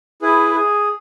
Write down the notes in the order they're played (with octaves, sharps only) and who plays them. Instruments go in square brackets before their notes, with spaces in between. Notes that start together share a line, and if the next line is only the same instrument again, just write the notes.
[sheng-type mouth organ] E4 G#4 B4
G#4